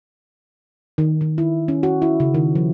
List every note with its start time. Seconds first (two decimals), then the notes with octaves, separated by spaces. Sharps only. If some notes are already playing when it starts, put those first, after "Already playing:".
0.98 D#3
1.21 D#3
1.38 E4
1.68 C#4
1.83 F#4
2.02 E4
2.20 C#3
2.34 D#3
2.55 F3